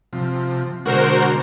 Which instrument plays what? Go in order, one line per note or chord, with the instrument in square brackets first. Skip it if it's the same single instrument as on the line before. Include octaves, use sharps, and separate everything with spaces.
[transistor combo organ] C3 F3
[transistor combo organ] B2 D3 G#3 [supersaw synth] F#4 A#4 C5